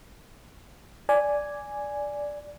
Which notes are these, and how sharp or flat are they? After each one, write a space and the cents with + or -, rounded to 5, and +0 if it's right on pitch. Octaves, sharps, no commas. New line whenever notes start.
D5 -5 G#5 +0